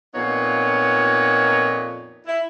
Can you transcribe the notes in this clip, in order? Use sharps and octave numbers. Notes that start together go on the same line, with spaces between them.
F2 A#2 B3 D#4 C#5
E4